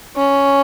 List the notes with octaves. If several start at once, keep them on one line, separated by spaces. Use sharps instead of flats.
C#4